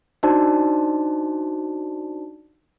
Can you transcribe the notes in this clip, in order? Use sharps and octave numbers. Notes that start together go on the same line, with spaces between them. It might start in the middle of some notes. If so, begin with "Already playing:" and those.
D4 D#4 F#4 C5 D5 A5